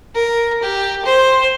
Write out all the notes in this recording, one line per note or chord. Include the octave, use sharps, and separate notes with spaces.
A#4
G4
C5